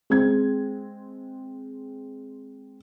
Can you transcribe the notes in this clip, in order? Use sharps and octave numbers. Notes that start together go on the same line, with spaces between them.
G#3 C4 G#6